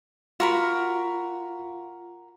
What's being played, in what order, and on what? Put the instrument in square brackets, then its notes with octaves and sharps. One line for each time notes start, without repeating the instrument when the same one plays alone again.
[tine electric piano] F4 [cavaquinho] F#4 A#4 B5